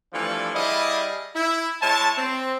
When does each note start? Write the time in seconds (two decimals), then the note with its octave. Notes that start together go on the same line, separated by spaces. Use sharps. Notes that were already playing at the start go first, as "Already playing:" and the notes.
0.13 E3 F3 G3 A3 D4 B4
0.55 G3 E4 G#4 D5 D#5 F5
1.36 E4
1.82 G#3 E4 C#5 A5
2.18 C4